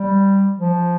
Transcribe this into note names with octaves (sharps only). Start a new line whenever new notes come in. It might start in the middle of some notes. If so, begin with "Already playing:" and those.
Already playing: G3
F3